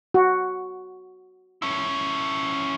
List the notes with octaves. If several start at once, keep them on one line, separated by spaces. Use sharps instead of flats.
F#4
C#4 E4